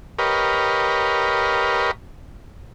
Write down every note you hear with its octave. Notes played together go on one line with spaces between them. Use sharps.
G4 A#4 B4 C#5 D#5 F5